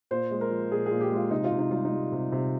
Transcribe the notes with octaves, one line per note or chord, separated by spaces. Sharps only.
A#2 C5
G#3
A#4
F3
A#2 G#4
A#2 G#4
G4
G#3
F4
C3 D#4
F4
C3
D#4
G3 F4
D#4
G3
C3
C3